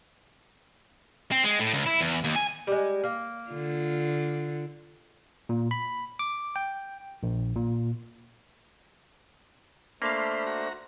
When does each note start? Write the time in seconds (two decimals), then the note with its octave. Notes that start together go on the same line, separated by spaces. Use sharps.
1.32 C4
1.44 G#3
1.59 A2
1.74 C#2
1.86 E4
2.01 E2
2.24 D#2
2.36 G#5
2.67 G3 G#3
3.04 A#3
3.49 D3 F4
5.49 A#2
5.71 B5
6.19 D6
6.56 G5
7.23 A#1
7.56 A#2
10.02 A3 A#3 D4 C5 F5 B5 C6 F6
10.46 F#4 A#5